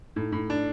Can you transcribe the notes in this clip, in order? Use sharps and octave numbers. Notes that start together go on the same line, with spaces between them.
A2 D#4
A2
D4